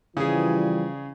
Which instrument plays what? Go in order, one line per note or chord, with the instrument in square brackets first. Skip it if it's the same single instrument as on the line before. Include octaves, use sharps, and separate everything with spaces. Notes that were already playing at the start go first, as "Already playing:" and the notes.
[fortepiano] C#3 G#4 [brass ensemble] E3 F3 G3